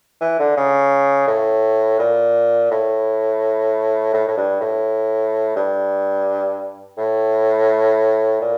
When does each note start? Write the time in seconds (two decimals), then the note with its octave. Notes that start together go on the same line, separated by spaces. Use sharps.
0.21 E3
0.39 D3
0.57 C#3
1.27 A2
1.99 A#2
2.71 A2
4.14 A2
4.28 A2
4.37 G2
4.60 A2
5.56 G2
6.98 A2
8.41 A#2